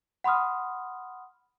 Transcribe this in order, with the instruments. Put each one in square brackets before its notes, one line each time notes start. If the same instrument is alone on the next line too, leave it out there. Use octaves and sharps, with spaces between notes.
[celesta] F#5 B5 C6 D#6 F6